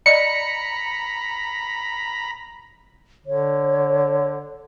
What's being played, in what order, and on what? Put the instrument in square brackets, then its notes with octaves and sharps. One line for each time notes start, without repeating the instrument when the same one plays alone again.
[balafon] D5 D#5 [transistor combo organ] A#5 B5 [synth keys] C#7
[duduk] D3 [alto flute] C#5